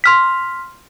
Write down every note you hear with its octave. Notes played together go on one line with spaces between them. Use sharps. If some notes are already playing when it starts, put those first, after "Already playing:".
C6 F6 B6